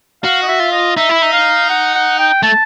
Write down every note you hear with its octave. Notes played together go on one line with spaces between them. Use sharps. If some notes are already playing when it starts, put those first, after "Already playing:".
F#4 F5
D#5
E5
F4
D#5
D#4 E5
E4
D#4
F5
F#5
F#5
G5
A3 A5